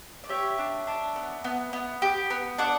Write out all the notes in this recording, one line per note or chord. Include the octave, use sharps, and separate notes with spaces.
D5
G4 C#5 E5
D4
D4
B3
B3
B3
G4
B3
D4 D5 F#5